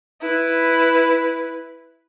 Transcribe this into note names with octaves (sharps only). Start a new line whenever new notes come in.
E4 B4